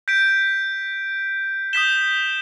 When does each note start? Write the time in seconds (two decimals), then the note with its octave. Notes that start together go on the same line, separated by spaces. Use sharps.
0.08 G6 B6 D7
1.73 D#6 G6 B6 E7 G7